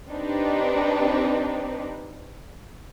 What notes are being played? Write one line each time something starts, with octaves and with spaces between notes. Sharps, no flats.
C4 D4 D#4 G4 B4